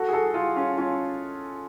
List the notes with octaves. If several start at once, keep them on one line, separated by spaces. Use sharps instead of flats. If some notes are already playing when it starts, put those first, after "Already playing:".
Already playing: F#4 A4
G#4
F#4 A4
F4 G#4
C#4 F4
C#4 F4